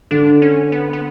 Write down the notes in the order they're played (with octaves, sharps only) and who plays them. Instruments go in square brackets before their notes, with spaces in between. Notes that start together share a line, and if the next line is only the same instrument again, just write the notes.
[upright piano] D3 [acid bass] D4
[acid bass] C#4
B3
B3